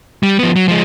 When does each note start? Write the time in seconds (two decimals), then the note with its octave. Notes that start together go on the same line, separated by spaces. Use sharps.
0.23 G3
0.39 F3 B3
0.56 F#3
0.68 F3 G#3